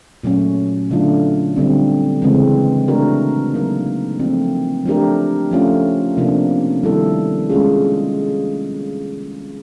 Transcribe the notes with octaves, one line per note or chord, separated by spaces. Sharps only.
A#2 F#3 A3 C#4
D3 F#3 A3 D4 F4
D3 G3 C4
C#3 E3 G#3 C4
A3 D4 F#4 A#4
F#3 A#3 D#4
F3 A3 C4
F3 A3 D4 G4 A#4
F3 A3 C#4 F4
C3 F3 A#3 D4
D#3 G3 B3 E4 A4
G#3 C#4 F4 G#4